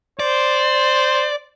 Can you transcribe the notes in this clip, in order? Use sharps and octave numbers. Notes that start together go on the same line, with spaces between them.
C5 D5